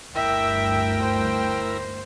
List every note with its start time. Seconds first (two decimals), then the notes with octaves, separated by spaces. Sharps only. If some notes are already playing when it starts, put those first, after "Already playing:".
0.15 G1 D2 E4 A#4 E5 G5
1.01 C5